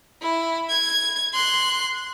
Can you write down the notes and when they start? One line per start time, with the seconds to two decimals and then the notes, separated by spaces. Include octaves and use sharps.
0.22 E4
0.69 G#6
1.34 C6 F#6